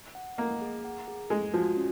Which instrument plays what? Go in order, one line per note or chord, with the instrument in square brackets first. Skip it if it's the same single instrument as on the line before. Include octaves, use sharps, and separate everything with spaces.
[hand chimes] F#5
[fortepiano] A#3 [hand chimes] D#5
[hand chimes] G#4
F#5
G#4
[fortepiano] G#3 [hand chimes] G#5
[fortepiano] F3 [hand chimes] F#4
[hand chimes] C#4